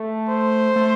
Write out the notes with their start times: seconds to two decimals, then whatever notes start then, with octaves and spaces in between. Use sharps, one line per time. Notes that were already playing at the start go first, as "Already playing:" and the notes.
Already playing: A3
0.29 C5
0.76 A3